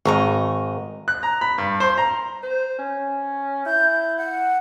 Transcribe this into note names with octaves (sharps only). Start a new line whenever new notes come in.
G#1 D#5 A#5 C#6
F#6
A#5
B5
G2
C5
A#5
C5
C#4
E4 G6
F#5